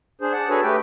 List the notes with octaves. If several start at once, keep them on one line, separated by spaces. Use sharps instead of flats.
D4 G#4 C5
D5 F#5 A5
D4 F#4 G#4 A4 B4 C#5
A3 G4 B4 G5